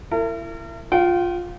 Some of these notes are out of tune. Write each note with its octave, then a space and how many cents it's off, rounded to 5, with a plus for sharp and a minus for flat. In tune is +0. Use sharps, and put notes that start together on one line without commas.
E4 +30 A#4 -40
F4 +10 G5 -40